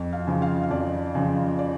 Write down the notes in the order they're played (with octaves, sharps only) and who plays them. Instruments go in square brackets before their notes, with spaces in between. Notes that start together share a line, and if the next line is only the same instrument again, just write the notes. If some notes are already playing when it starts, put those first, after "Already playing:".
Already playing: [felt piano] F2
F5
C#3 F3
F5
F5
F2 D5
C#3 F3
D5